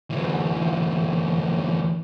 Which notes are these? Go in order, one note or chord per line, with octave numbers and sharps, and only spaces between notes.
D2 E3